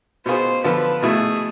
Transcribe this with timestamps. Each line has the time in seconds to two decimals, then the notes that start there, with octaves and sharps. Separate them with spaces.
0.25 B2 B3 F4 G#4 C5
0.64 D3 F3 B3 F4 A4 B4
1.02 B2 A3 E4 G#4